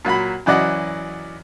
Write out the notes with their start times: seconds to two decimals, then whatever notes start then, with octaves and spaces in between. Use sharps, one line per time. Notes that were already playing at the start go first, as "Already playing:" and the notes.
0.05 A#2 F#3 F#4 B5
0.46 F#2 E3 F#3 D5 D#5 F#5